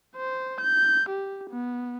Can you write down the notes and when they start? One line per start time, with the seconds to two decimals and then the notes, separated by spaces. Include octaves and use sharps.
0.17 C5
0.61 G6
1.09 G4
1.51 B3